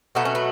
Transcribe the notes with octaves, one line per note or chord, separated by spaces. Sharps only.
B2 F#3 A3 B3
C#4
B3